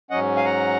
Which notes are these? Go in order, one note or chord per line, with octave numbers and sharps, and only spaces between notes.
G#2 F#3 C#4 D#5 F#5
F5 G#5
F#5 A#5